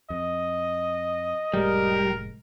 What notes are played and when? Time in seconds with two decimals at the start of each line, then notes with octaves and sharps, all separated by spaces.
0.10 F2 D#5
1.54 F1 A2 G3 G#3 A#4